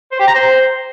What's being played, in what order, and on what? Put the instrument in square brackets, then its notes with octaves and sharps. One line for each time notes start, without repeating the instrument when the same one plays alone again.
[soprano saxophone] C5
G4
A#5
C5